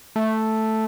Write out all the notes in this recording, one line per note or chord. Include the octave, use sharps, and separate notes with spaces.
A3